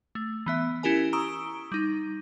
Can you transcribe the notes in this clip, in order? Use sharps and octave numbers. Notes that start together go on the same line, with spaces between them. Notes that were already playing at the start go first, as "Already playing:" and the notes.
A3
E3 B3 E5
C#4 E4 G4 A#4 G#5
A#5 C#6 D#6 E6 D7 G7
G3 D#4